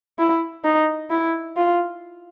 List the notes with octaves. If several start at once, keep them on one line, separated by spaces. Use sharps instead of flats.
E4
D#4
E4
F4